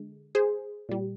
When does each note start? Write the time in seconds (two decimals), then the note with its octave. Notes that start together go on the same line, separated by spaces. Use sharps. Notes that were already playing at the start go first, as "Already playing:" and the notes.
Already playing: D3 G#3
0.35 G#4 C5
0.89 A#2 G3